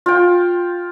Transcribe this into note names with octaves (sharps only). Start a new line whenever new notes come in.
F4 G5